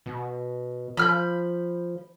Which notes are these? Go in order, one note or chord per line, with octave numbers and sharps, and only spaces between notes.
B2
F3 B5 F6 G6